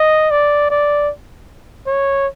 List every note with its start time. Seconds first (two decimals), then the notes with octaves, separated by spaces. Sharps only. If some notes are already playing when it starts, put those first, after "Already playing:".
Already playing: D#5
0.31 D5
0.70 D5
1.86 C#5